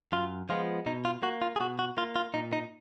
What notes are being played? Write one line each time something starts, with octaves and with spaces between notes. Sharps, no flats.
F#2 F4
F3 G#3 B3 F4
B2 D#4
F4
A#3 F#4
F4
G#4
B2 F#4
F#4
A#3 F4
F4
A#2 D#4
D#4